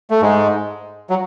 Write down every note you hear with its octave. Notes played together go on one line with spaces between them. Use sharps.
A3
G#2 G#3
F#3